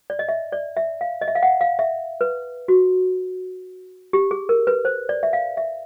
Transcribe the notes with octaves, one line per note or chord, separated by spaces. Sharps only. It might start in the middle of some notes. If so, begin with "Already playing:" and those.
D5
D#5
E5
D5
E5
F5
D#5
E5
F5
F#5
F5
E5
B4
F#4
G4
G#4
A#4
B4
C5
D5
E5
F5
E5